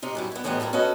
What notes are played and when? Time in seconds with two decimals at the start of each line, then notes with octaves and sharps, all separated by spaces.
0.02 C3 D#4 F4
0.15 F#2 G3 E4
0.32 B3 E4
0.44 A2 E3 G3 B3 D#4 F4
0.60 F3 G3 E4 A4 A#4
0.73 C#4 F#4 A4 B4 D#5